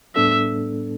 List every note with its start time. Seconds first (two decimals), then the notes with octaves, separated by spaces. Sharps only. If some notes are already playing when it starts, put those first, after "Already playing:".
0.16 A2 G3 B3 D4 A4 E5